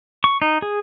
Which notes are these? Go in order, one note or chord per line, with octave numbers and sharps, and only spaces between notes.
C#6
D#4
G#4